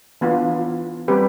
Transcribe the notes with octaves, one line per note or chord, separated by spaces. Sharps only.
E3 B3 D4 F4
G3 C4 G4 B4